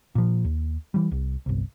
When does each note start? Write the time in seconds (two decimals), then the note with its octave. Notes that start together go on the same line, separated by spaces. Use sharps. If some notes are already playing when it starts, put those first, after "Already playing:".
0.15 A#2 F3
0.44 D#2
0.94 E3 G3
1.12 C2
1.46 G1 C2